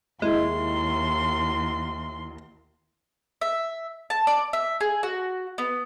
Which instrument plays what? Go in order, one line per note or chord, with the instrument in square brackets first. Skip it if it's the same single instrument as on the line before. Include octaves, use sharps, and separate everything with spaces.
[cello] D#2 [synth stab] G#3 [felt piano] E4 [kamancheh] C6
[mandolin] E5
A5
D5
E5
G#4
F#4
B3